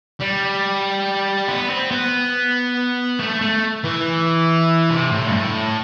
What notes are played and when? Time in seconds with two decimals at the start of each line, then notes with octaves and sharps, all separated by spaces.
0.20 G3
1.48 B3
1.70 C4
1.91 B3
3.19 A3
3.41 A3
3.84 E3
4.90 C3
5.12 A2
5.26 G2
5.33 A2